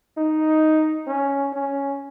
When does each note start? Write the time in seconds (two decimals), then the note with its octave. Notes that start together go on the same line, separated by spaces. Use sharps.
0.17 D#4
1.07 C#4
1.53 C#4